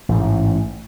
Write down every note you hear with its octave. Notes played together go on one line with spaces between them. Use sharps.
A1 G#2